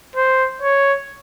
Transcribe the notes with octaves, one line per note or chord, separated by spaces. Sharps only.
C5
C#5